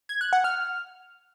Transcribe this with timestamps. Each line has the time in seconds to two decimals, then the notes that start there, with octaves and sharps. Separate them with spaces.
0.09 G#6
0.21 F#6
0.33 F#5
0.44 F6